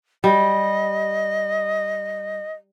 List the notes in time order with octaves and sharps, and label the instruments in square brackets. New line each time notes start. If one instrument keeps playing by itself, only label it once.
[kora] G3 [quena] D#5